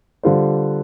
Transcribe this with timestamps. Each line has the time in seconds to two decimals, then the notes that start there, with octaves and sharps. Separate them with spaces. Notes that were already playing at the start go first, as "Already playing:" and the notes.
0.23 D3 G3 F4 C5